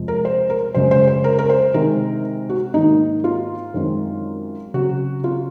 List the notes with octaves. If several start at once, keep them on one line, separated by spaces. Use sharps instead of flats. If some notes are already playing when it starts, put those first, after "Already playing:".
Already playing: F2 C3 F3 G#3
A#4
C5
A#4
F#2 C#3 G#3 C5
C5
C5
A#4
A#4
C5
C3 D#3 G#3 C4 A#4
F#4
G#2 D#3 A#3 D#4
F4
F#2 D#3 G#3 C4
C#3 F#3 C4 F#4
F4